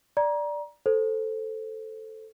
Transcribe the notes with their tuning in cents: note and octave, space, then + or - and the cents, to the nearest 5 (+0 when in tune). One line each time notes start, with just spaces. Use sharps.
D5 +0 A#5 +25
A4 +0 C5 +0